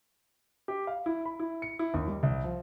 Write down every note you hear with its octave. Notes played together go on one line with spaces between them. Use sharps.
G4
F5
E4
B5
E4
C#7
E4
D#2
G3
C2
F3